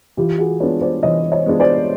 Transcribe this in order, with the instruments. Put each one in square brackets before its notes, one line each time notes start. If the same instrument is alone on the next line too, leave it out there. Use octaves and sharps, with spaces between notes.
[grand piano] E3 [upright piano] F4 G4
[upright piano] F#4 G#4
[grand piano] G#3 B3 D4 F4 [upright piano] B4 C#5
[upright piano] C5 D5
[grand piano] E3 [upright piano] C#5 D#5
[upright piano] C#5 D#5
[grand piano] G#3 B3 D4 F4
[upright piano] C5 D5